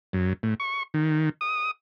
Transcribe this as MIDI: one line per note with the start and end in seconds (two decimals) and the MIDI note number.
0.13 0.33 42
0.43 0.54 45
0.60 0.83 85
0.94 1.29 51
1.41 1.71 87